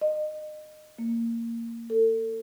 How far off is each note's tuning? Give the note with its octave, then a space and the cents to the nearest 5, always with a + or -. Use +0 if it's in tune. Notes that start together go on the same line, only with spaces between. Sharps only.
D#5 -25
A#3 -15
A4 +35